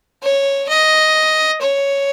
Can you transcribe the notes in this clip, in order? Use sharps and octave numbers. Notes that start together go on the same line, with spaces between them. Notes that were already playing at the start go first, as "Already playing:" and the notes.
C#5
D#5
C#5